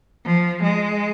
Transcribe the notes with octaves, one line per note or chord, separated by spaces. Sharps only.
F3
G#3